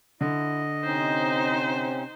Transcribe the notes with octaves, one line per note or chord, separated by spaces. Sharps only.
D3 E4 D#5
C3 C4 C#4 D#4 C5